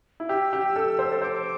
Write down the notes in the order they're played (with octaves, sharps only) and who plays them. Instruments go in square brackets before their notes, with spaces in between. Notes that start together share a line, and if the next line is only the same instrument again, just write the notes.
[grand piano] E4
[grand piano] G4 [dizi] E6
[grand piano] G4
A4
C5
A4
[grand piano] C5 [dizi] D6